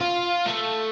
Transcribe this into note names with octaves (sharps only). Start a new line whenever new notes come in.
F4
A3